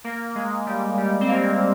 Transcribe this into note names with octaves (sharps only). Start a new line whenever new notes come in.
A#3
G#3
G3
G3
C4
A#3